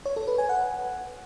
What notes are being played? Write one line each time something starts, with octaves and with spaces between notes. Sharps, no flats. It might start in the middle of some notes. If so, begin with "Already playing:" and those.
C#5
A4
B4
G#5
F#5